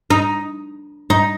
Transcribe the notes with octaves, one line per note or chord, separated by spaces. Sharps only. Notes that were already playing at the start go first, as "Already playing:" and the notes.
D#4
D#4